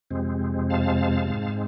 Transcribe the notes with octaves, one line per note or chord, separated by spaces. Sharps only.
F2 C3 G#3 C4
F5 A5
G#2 G#3 C4